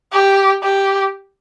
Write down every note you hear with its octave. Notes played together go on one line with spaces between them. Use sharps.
G4
G4